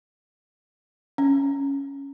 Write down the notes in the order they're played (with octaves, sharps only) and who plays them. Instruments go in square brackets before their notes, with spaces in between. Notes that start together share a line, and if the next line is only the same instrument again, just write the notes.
[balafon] C#4